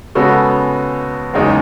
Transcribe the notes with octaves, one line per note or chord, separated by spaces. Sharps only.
C#3 G#3 B3 F#4 A4
F#1 E2 C#3 G#3 D#4